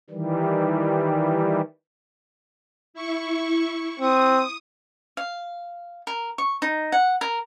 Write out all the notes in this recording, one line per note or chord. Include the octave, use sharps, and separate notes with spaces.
D#3 E3 G3
E4 C#6
C4 D#6
F5
A#4
C#6
D#4
F#5
A#4